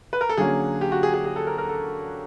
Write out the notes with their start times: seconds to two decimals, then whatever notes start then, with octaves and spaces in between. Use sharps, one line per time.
0.13 B4
0.21 A#4
0.29 A4
0.37 D3 F#3 A#3 C#4 G#4
0.81 G4
0.92 F#4
1.03 G#4
1.14 G#4
1.25 G#4
1.36 A4
1.47 A#4
1.58 A#4
1.69 A4